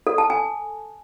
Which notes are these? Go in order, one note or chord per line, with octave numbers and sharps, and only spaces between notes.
A4
A5
G#5